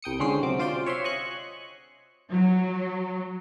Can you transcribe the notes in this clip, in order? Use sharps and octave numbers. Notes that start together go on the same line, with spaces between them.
C2 G5 D#6 C#7
D3 G#3 C#4 C5 C7
C3 F#3 D6
F4 C5 D5 G5
C#5 E5 F#5 C6
D#5 G#5 C#6 F#6
F#3